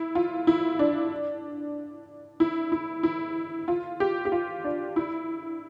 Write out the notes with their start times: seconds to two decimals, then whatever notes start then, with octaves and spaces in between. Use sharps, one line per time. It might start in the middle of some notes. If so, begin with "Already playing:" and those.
Already playing: E4
0.15 F4
0.47 E4
0.79 D4
2.40 E4
2.72 E4
3.03 E4
3.68 F4
4.00 G4
4.25 G4
4.32 F4
4.64 D4
4.96 E4